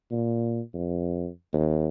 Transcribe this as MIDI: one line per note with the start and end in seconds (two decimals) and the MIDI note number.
0.11 0.60 46
0.74 1.28 41
1.53 1.88 39